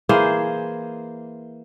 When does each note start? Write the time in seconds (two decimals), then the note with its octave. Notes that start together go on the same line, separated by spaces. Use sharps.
0.09 E3 A#3 G#4 C5